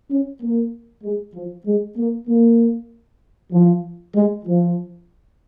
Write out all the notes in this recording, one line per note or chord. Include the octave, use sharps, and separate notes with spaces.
C#4
A#3
G#3
F3
G#3
A#3
A#3
F3
G#3
F3